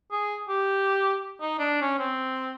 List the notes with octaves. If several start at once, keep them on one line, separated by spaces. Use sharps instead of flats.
G#4
G4
D#4
D4
C#4
C4